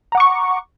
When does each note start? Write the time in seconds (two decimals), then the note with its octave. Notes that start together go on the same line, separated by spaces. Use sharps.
0.12 A#5
0.15 F#5
0.17 D6
0.20 C#6